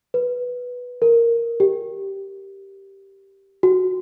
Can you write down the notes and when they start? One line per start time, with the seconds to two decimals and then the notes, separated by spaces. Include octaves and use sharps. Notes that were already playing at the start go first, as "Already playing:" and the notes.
0.14 B4
1.02 A#4
1.60 G4
3.63 F#4